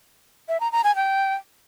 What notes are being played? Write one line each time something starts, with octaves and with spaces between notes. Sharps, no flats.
E5
A#5
A#5
G#5
G5